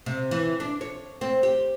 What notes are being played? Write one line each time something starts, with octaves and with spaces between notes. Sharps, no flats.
C3
E3
D4
C#5
C4
G4